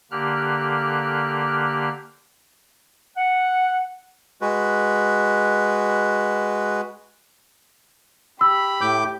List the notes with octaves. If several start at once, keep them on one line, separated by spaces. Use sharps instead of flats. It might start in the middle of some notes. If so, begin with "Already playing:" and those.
D3 A#3 G4 F6 F#6
F#5
G#3 F#4 B4
G4 B5 E6
A2 D6 G6